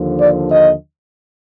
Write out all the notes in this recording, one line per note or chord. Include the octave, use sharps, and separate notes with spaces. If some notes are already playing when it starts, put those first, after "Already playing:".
Already playing: D#2 D3 F3
D5
D#5